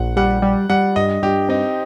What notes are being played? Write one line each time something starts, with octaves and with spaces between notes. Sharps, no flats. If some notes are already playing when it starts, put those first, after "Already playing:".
Already playing: A#1 F#5
G3 F#5
G3
G3 F#5
G2 D#5
G2 G4
C4 D#4